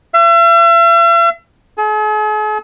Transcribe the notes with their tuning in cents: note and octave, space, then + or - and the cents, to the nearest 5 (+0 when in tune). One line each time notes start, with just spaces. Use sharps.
E5 +45
G#4 +45